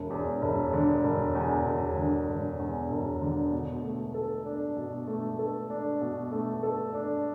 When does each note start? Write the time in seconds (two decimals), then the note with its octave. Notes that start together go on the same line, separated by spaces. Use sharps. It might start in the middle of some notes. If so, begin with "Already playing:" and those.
Already playing: E1
0.10 E2
0.42 E1
0.73 D3
1.04 E1
1.35 E2
1.66 E1
1.97 D3
2.28 E1
2.59 E2
2.90 E1
3.22 D3
3.52 B2
3.83 A3
4.14 A4
4.46 D4
4.77 B2
5.08 A3
5.39 A4
5.70 D4
6.01 B2
6.32 A3
6.63 A4
6.94 D4